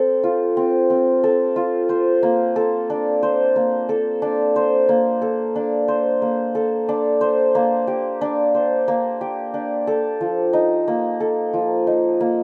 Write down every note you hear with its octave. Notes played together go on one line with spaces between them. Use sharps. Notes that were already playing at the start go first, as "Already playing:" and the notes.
Already playing: C4 A4
F4
C4
C4
A4
F4
C5
A#3
A4
D4
C5
A#3
A4
D4
C5
A#3
A4
D4
C5
A#3
A4
D4
C5
A#3
G4
D4
C5
A#3
G4
D4
A4
F3
D#4
A#3
A4
F3
D#4
A#3